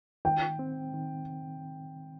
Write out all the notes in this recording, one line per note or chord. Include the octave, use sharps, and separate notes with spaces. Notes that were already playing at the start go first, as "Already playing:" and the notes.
D#3 G5
C4
D#3